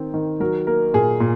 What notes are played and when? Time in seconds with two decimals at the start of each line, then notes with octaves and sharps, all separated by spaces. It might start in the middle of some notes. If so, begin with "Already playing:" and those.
Already playing: D#3 C4
0.14 D#3
0.40 F#3 A#4
0.67 A#3 A#4
0.93 A#2 G#4
1.20 A#2